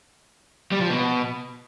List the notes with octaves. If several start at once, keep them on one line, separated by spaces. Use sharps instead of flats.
G3
F3
B2